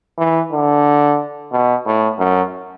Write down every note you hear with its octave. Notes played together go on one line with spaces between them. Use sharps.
E3
D3
B2
A2
F#2